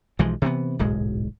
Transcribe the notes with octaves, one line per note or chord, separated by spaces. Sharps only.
B1 E3 F3 G#3
C3 E3 G3 B3
D1 B1 G#2 G#3